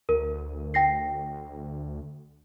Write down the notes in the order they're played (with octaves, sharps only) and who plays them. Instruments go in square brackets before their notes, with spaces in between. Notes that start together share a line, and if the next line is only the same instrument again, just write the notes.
[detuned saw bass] D2 [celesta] A#4
[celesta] G5 A#6 C7